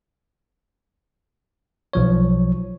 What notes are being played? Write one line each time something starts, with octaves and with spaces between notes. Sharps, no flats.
B1 F3 C#5